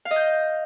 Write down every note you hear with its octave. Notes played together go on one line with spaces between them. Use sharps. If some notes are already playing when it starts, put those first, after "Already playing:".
F5
D#5
G6